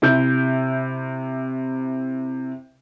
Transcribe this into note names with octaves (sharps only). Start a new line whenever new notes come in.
C3 E4 G6